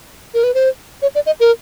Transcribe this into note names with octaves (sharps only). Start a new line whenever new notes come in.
A#4
B4
C5
C#5
D5
D#5
A#4